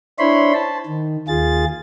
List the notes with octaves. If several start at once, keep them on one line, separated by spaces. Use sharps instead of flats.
D4 E4 C5 C#5 B5 C6
C5 A5
D#3
D#2 F4 G#4 A6